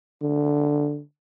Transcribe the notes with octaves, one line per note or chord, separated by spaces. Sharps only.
D3